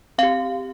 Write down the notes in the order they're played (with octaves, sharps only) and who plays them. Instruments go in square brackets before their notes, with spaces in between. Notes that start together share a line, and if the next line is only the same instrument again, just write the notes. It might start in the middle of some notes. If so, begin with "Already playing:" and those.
[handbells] C4 G4 F5